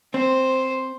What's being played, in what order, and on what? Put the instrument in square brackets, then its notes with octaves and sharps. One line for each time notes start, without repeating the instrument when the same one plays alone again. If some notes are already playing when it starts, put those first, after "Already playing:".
[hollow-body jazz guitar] C4 [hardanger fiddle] C5